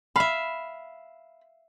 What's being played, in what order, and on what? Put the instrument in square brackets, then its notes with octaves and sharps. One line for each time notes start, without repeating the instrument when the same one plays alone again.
[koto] E5 F5 [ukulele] B5